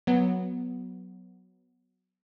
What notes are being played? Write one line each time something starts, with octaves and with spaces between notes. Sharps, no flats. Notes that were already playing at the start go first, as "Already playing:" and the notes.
F#3 B3